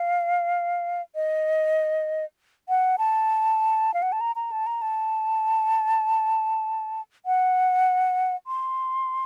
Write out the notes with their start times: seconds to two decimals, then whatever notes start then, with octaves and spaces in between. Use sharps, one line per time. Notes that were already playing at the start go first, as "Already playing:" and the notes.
Already playing: F5
1.15 D#5
2.69 F#5
2.98 A5
3.94 F5
4.02 F#5
4.12 A5
4.21 A#5
4.36 A#5
4.52 A5
4.67 A#5
4.82 A5
7.26 F#5
8.47 C6